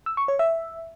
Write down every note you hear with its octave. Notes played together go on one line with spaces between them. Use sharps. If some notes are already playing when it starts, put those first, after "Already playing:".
E6
C#6
C#5
E5